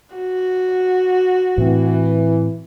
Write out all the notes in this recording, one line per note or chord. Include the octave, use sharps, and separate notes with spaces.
F#4
A2 E3 C4